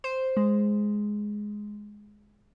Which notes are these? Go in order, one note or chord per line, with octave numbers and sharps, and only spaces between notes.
C5
G#3